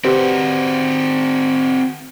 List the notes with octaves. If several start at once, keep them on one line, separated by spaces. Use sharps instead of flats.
C4 F#4 G4 B4 C5